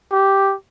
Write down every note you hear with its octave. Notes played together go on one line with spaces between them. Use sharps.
G4